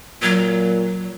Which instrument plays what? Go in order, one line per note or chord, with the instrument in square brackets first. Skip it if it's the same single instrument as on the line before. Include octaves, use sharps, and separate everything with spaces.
[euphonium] A#2 [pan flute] F#3